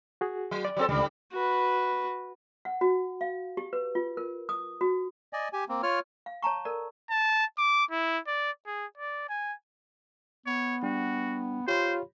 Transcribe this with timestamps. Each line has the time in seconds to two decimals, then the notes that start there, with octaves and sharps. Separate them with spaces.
0.21 F#4 G#4
0.51 F#3
0.65 D5
0.77 F#3 C4 A4
0.89 C#2 G#2 D3 G3
1.32 F#4 B4
2.65 F#5
2.81 F#4
3.21 F5
3.57 G4
3.73 B4
3.95 F4
4.17 A#4
4.49 D#6
4.81 F#4
5.33 D5 D#5 G#5
5.53 G4 G#5
5.69 A#3 C4
5.83 F4 C#5 F6
6.26 F5
6.42 C#5 A5 A#5 C#6
6.65 A4 A#4 D5
7.10 A5
7.58 D6
7.91 E4
8.27 D5
8.66 G#4
8.98 D5
9.29 G#5
10.46 B3 C#5
10.83 G3 D4 F#4 G5
11.68 F4 G4 C5 C#5 B5